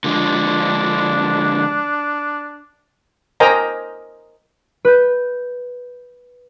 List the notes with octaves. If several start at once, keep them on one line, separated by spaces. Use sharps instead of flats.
D3 F3 G#3 D4
A#4 C5 D#5 G5 G#5 A#5
B4 G6